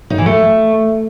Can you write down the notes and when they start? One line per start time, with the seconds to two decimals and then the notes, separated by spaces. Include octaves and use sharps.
0.10 D#4
0.18 E3
0.26 A3